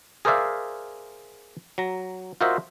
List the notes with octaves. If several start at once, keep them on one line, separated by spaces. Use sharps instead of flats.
G#4 A#4 C5 D5 E5 F5
F#3 A#5
F4 F#4 A#4 C5 D#5 E5